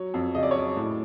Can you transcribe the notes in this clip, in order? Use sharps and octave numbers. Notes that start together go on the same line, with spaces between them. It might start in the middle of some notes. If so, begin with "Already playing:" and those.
Already playing: F#3 C#5
F2
C#3 D#5
D5
C#5
F#3 D5
A2